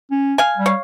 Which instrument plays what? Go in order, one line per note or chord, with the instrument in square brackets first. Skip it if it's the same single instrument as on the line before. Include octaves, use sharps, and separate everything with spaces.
[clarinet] C#4
[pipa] F5 G#5
[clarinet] G3
[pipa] C#5 F5